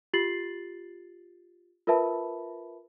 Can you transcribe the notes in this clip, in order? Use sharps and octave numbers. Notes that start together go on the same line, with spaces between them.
F4 G4 A6 C7 F#7
F4 A#4 B4 E5 A5 B5